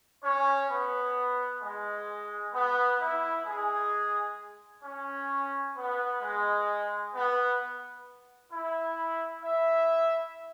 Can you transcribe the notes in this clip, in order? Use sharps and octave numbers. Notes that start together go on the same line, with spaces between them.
C#4 C#5
B3
G#3
B3
E4
G#3 G#4
C#4
B3
G#3
B3
E4
E4 E5